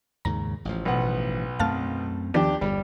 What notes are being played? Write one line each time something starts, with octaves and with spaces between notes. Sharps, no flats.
D#2 G#2 C#3 A#5
A1 F3
B1 B3 F#5
F#2 A3 C4 F5 A5 F6
D#2 D#3 F3 B3 D4 G4
G1 E2 G2 G3